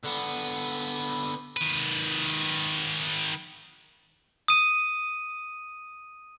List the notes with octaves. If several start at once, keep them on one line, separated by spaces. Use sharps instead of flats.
D3 B3
D#3 B4
D#6 D#7